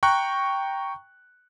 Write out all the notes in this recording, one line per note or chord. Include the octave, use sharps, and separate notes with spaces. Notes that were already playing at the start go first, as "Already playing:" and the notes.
G5 A#5 C#6 F#6